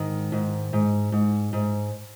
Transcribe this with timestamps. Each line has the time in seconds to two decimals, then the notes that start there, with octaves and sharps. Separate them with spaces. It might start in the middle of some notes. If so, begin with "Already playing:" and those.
Already playing: G#2 D#3
0.32 G#2
0.73 G#2
1.12 G#2
1.53 G#2